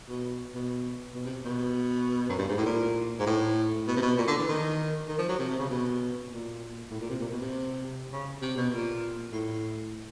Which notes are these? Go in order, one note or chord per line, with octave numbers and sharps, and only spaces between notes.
B2
B2
B2
C3
B2
F#2
G2
G#2
A2
A#2
G#2
A2
B2
C3
B2
A#2
D3
E3
D#3
D#3
F3
F#3
C3
C3
C#3
B2
A#2
A2
A#2
C3
A#2
B2
C3
C#3
C3
B2
A#2
A2